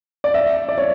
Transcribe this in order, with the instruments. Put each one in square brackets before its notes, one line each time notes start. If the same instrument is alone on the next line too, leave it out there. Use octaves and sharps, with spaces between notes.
[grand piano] D5
E5
D5
C#5